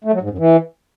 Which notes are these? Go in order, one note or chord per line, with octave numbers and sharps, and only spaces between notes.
A3
F#3
G#2
F#2
E3